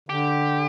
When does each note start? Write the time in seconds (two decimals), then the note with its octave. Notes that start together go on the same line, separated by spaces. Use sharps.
0.09 D3 G4